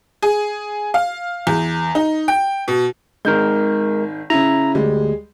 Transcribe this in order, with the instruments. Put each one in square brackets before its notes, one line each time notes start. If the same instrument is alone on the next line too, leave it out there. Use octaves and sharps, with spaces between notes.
[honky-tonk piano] G#4
F5
E2
D#4
G5
B2
[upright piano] G#1 D#3 G6 [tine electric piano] G#3 A#4
[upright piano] C#3 E4 [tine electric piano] A#5
[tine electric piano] D2 [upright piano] G3 G#3